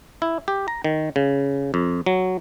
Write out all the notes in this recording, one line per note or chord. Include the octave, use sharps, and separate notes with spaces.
E4
G4
A#5
D#3
C#3
F2
F#3